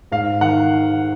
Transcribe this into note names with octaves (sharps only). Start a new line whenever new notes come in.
G#2 F5
D#3 F#5